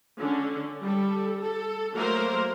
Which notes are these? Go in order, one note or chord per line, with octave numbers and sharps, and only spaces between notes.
D3 C#4
G3 A4
A4
F#3 A3 A#3 A#4 C5